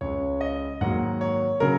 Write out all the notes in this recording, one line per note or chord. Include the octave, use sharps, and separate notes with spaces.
C#2 C#3 G#3 C#5
D#5
G#2 D#3 F#3 A#3 F#5
C#5
C#3 F#3 A#4